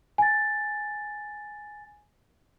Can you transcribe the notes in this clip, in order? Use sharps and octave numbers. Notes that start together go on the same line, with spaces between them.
G#5 A6